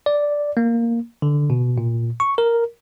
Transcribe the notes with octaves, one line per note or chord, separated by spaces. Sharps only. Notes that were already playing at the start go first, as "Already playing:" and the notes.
D5
A#3
D3
B2
A#2
C#6
A#4